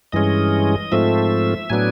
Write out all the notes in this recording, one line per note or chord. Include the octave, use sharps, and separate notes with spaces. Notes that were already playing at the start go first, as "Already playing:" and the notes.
G2 E3 G#3 C#4 D#5
G#2 F3 A3 C4 E5
A2 F#3 B3 D4 G#5